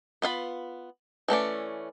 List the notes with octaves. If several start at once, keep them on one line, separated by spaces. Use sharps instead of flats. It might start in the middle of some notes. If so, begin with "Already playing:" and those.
B3 F4 F5 B5
E3 A3 C#4 D5